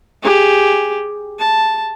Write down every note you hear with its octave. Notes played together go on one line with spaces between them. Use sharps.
G4 G#4
A5